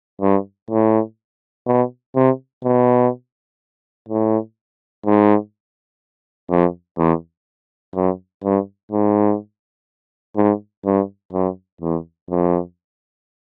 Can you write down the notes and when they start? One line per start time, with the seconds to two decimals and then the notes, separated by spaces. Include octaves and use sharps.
0.22 G2
0.71 A2
1.67 B2
2.16 C3
2.64 B2
4.09 A2
5.06 G#2
6.50 F2
6.98 E2
7.95 F#2
8.43 G2
8.92 G#2
10.36 G#2
10.85 G2
11.33 F#2
11.81 E2
12.30 F2